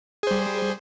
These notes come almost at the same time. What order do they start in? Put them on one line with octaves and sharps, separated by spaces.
G#4 C5 G3